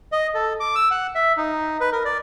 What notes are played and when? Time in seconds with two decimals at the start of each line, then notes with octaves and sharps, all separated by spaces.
0.12 D#5
0.35 A4
0.60 D6
0.75 E6
0.91 F#5
1.15 E5
1.37 D#4
1.81 B4
1.92 A#4
2.05 D5